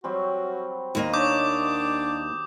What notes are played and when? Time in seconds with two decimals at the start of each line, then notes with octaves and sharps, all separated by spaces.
0.04 F#3 G3 C4 F#4
0.95 D#2 A#3 D#5
1.13 D4 C#5 D6 D#6 G6